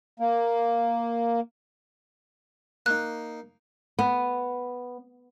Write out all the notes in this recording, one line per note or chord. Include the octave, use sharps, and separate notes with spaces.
A#3
A#3 D#4 F#6
B3